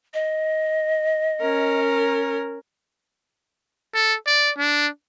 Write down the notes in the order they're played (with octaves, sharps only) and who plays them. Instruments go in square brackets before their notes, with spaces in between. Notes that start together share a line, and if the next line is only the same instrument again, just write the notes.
[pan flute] D#5
[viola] C#4 A#4
[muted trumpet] A4
D5
D4